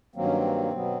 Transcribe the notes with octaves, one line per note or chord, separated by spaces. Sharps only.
G2 D#3 F#3 A#3 C4
C#4
C4
B2 F#3 B3